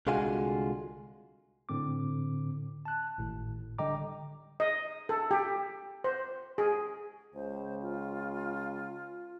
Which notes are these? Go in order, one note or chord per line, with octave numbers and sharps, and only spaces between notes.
C2 D3 G#3 F4 F#4 G#5
A2 D3 C4 D6
A5 F#6
G#1 A2
D3 G3 D#5 G5 A#5 D6
D#5
A4
G4
C5
G#4
C#2 C5
F4